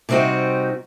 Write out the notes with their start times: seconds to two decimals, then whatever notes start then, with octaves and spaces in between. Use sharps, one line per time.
0.09 C3 G3 C4 D#4 F#4